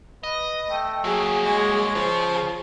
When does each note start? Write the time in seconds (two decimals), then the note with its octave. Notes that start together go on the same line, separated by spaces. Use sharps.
0.23 B4 D#5
0.69 A3 G5
1.04 F#3 A#3 F#4 G#4
1.45 G#3 C#5
1.95 C#3 F3 G#4